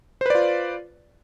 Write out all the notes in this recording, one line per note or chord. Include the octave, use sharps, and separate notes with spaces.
F4 B4 C5 D5